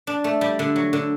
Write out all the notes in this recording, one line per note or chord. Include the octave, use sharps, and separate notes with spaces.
D4
A3
G3
D3
F#3
D3